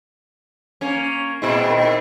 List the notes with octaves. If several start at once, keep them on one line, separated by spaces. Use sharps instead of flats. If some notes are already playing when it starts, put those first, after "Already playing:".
A#3 C#4
A#2 G#3 C4 E4
D#3